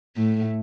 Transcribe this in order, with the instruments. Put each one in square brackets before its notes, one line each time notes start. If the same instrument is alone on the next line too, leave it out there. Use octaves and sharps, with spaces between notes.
[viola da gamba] A2 A3